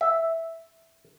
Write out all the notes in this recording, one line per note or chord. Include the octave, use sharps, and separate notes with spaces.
E5